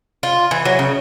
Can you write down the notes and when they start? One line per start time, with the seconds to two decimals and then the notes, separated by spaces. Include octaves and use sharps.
0.23 F4
0.51 E3
0.65 F#3
0.79 C#3